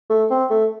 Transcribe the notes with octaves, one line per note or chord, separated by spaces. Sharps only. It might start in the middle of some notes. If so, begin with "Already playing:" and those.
A3
C4
A3